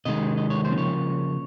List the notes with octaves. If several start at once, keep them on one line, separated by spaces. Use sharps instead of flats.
C3 D#3 G#3 D#5
D#5
C#5
C5
C#3 F3 A#3
C#5